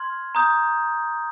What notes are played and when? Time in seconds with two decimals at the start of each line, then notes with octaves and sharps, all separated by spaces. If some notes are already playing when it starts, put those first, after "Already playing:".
Already playing: C6 F6 G#6
0.35 A#5 D#6 G6